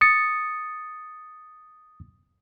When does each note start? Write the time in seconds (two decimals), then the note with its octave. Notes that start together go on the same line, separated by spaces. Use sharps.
0.01 D#6 A6 C#7